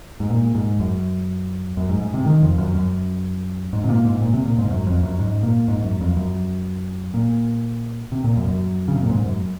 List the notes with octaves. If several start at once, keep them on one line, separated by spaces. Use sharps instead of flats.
G#2
A#2
G#2
F#2
F#2
G#2
G#2
C3
D#3
F2
F#2
F#2
G#2
C3
A#2
G#2
A#2
C3
A#2
G#2
F#2
F2
F#2
G#2
A#2
G#2
F#2
F2
F#2
A#2
C3
A#2
F#2
F#2
C#3
C3
A#2
G#2
F#2